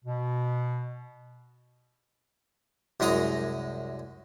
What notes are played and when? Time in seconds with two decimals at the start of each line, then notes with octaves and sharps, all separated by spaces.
0.05 B2
3.00 C2 F#2 G#3 D#5 A#5